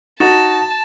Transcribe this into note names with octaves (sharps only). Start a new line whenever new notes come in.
D#4 F#4 A5 A6 E7